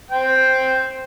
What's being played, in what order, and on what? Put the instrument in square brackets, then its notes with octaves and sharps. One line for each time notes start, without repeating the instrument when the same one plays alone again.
[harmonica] C5 G5